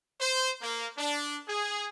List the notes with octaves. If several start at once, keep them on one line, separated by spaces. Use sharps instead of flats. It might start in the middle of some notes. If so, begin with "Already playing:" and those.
C5
A#3
D4
G#4